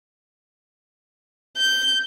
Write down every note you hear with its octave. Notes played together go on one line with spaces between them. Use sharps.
G6